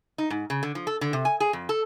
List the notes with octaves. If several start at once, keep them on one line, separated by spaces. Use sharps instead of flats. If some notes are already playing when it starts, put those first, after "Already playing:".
D#4
G#2
C#3
D3
F3
A4
D3
C3
G#5
G#4
F2
A4